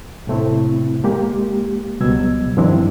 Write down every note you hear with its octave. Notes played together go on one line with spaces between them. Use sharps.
A2 C3 A3 C4 E4
G#3 A#3 G4
C#2 B2 F#3 G3 E6 G#6
G2 D#3 F3 C4 D4 E4